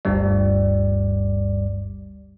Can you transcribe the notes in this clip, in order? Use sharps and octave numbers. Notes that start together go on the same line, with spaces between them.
G1 D2 G2 G3 D5